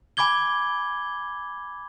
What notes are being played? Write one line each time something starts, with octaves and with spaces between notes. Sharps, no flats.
G#5 B5 D6 G#6 G7